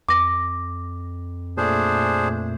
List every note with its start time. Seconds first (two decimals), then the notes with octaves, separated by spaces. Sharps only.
0.09 F2 D6 A#6
1.57 A#2 A3 D4 G#4 C5